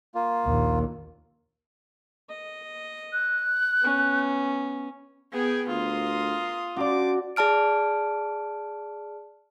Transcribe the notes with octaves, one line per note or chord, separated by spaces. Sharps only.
A#3 F4
A#1 D#2
D#5
F#6
B3 C#4
B3 G#4 G5 G#5
D2 F4 A#4 C6 D#6
C#4 F#4 C5 D5 A5 D6
G#4 D5 A5 F6 D7